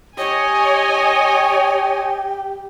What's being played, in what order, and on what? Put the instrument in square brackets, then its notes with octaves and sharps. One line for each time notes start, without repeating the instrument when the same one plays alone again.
[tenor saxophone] G4 [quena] C#5 [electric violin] D#5 [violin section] G#5